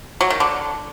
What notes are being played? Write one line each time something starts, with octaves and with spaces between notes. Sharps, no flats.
F#3
D#3
D3